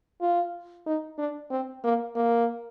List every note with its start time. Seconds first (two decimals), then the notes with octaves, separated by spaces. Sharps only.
0.21 F4
0.86 D#4
1.18 D4
1.51 C4
1.84 A#3
2.16 A#3